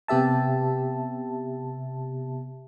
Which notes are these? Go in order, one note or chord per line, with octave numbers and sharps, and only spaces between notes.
C3 B3 G4 E5 A5